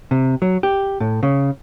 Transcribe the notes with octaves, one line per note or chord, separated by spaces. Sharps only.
C3
F#3
G4
A2
C#3